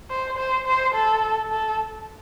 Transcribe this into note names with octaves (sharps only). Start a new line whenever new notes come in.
C5
C5
C5
A4
A4